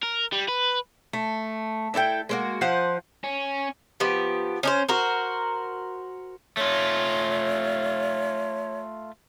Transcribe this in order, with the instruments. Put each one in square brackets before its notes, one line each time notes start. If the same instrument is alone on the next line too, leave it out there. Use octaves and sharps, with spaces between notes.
[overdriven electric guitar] A#4
G3
B4
[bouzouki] A3
D4 E4 A4 G5
G#3 A#3 F#4
F3 C5 F5 F#5
[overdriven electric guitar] C#4
[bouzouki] F3 B3 G4
C#4 D4 C5
F#4 A#4 C5
[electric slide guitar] A3 F4 [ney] C#5